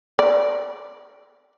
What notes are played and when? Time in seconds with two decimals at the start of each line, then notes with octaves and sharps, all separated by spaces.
0.19 D5